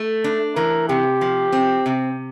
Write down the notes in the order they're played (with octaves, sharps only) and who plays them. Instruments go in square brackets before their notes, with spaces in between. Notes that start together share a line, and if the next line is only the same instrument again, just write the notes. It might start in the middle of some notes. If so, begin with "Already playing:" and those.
Already playing: [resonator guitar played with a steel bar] A3
D4
[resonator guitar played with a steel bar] E3 [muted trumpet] A#4
[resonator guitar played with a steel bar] C3 [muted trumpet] G4
[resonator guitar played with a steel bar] F3
C4
C3